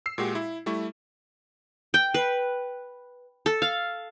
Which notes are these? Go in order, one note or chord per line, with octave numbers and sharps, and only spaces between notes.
E6 C7
A#2 G#3 F#4 G4
E4
G3 A3 E4 C#6
G5
B4
A4
F5